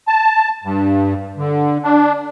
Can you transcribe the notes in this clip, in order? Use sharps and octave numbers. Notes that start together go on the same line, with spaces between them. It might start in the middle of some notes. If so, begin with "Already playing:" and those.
A5
G2
D3
D4